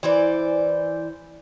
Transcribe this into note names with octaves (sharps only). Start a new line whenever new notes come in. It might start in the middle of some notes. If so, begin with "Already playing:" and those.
E3 C5 D5